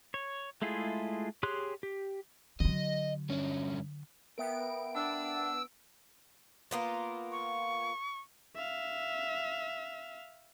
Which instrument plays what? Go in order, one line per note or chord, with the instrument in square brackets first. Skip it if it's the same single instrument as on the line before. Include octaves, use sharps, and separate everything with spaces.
[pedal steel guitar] C#5
G#3 A3 E4 F4 G#4
G4 G#4 C#5 C6 F#6
G4
[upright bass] D3 F#3 [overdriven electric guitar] D#5
[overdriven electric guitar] G2 C#4
[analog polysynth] B3 D7 [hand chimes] A#4 E5 G5
[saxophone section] D4 [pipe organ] E6
[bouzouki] A#3 B3 F4
[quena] C#6
[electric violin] E5 F5